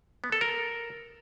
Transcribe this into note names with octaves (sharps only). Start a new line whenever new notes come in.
B3
A4
A#4